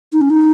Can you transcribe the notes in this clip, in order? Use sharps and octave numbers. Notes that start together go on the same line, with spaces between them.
D#4
C#4
D#4